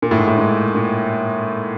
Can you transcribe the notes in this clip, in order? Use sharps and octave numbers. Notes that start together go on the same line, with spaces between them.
A#2
A2
G#2
A2
G#2
A#2